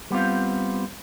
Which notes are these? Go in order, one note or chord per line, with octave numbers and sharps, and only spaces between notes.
G3 B3 C4 F4